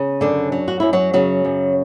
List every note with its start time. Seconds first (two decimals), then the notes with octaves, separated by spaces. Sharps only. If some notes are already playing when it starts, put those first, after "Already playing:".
Already playing: C#3
0.21 F#2 D3 D4
0.52 F#3
0.68 F#4
0.80 F#2 E4
0.93 F#3 F#4
1.14 C#3 F#3 F#4
1.45 F#2